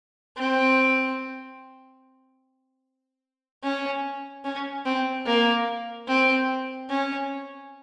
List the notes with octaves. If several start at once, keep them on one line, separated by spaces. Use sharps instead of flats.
C4
C#4
C#4
C4
A#3
C4
C#4